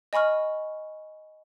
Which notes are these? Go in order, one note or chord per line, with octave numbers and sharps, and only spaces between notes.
D#5 G#5 B5 C#6 F6